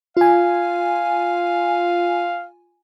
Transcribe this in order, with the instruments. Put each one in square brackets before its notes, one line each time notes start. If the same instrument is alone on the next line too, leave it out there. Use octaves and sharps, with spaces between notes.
[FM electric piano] F4 G#5 [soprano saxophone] F5